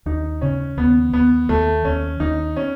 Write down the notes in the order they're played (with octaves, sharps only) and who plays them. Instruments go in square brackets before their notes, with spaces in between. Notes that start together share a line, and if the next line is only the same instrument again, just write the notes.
[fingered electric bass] D#2 [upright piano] D#4
[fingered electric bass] C#3 [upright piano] C#4
[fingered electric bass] D#2 [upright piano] B3
[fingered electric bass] D#2 [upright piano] B3
[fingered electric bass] D#2 [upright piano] A3
[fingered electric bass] D#2 [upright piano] C#4
[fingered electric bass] D#2 [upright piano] D#4
[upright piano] C#4